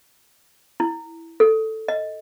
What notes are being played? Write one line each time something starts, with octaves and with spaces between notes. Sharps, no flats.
E4
A4
D#5